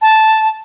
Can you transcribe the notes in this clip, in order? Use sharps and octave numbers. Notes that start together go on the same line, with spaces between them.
A5